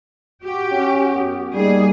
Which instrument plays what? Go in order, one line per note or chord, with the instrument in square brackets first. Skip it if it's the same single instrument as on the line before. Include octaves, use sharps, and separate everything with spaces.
[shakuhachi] F#4 [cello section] G4
[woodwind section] C#4 [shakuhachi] F#4
[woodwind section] F#2 B3
[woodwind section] G3 [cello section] A#3 G#4 [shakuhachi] D#4